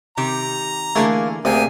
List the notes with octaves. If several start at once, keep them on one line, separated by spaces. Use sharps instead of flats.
C3 D#3 G4 A#5
D3 E3 A3 A#3 G#4
D2 C3 A#3 B3 G4 G#4 G#5